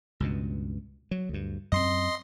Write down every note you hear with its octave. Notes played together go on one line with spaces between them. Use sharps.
C#2 G2 B2
F#3
D2 G2
F#2 C4 D#5 C6 C7